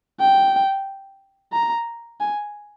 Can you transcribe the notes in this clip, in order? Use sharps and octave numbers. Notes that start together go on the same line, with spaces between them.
G5
A#5
G#5